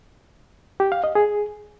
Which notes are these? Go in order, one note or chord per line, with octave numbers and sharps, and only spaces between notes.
G4
F5
D#5
G#4